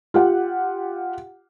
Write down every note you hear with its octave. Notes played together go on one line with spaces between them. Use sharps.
F4 G4 F#5